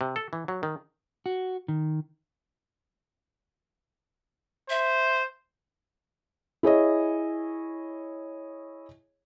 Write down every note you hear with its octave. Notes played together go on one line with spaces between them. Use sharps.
C3
A4
E3
F#3
D#3
F#4
D#3
C5 E5
E4 G#4 C#5 D#5